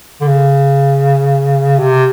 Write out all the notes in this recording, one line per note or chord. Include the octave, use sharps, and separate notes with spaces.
D3
C#3
C3